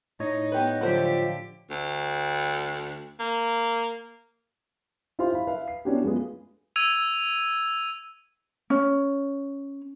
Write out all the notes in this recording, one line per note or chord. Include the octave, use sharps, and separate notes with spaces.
A2 D#4 C#5 D#5
B3 G4 B4
D3 F3 F#3 A3 G4 C5
D2
A#3
E4 F4 G4 C5 F5 C6
E4 B5
B4 E5 F5
C7
B3 C#4 D4 E4 F#4 G4
G#3 A3 B3 F4 G#4
E6 G#6 D#7 F7
C#4